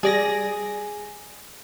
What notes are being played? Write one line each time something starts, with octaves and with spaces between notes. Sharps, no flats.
G3 G#4 D5 A#6